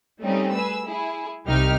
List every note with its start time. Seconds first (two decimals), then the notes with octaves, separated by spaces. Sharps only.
0.21 G3 A3 C4 C#4 D#4
0.53 G#4 B4 E6
0.86 E4 G#4
1.46 C2 C3 D#4 G4 G5 F6